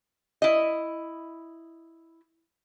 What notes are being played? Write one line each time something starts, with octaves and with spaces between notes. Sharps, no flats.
E4 D#5